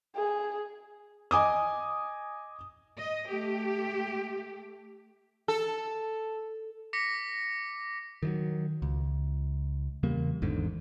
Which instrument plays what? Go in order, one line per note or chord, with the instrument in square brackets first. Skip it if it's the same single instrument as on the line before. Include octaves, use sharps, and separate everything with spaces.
[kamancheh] G#4
[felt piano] D#5 G#5 D6 D#6
[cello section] D#5
A3 G4
[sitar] A4
[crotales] D6 A#6 B6 C#7
[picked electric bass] D#3 E3 F#3
C#2
E2 C#3 G3 A#3
G#1 E2 G#2 D3